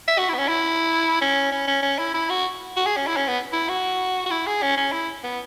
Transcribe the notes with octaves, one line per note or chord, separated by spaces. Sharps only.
E5
F#4
E4
B3
C#4
E4
C#4
C#4
C#4
C#4
E4
E4
F#4
F#4
G#4
C#4
E4
C#4
B3
E4
F#4
F#4
E4
G#4
C#4
C#4
E4
B3